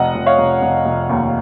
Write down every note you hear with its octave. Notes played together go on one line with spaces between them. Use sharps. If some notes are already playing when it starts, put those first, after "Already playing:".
Already playing: F1 D#5 F#5
F1
C#5 F5
F1
F1
F1
D#2